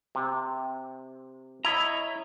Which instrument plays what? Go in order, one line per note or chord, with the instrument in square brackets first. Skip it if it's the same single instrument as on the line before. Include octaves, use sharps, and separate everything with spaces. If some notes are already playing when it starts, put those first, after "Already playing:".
[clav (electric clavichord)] C3
[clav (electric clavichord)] E4 [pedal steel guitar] C#5 D#5 A#5